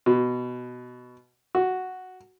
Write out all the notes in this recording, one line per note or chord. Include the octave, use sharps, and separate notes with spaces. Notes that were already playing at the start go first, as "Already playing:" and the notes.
B2
F#4